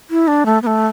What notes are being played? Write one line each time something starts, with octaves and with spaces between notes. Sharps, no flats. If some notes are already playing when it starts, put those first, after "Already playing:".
E4
D4
A3
B3
A3